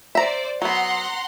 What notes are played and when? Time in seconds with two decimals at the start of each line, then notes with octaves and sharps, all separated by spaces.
0.15 C5 D5 E5 A#5
0.62 F#3 B3 F#5 A#5 C6